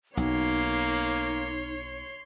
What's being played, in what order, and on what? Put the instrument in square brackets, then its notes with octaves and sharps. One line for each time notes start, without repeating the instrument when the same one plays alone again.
[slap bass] B1 [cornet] A#3 [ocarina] D#4 [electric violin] C#5 C6